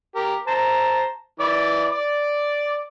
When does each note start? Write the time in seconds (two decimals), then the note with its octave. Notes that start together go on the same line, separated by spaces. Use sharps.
0.16 G4 A#4
0.47 C5 A5 A#5
1.40 E3 D5 D6
1.92 D5 D6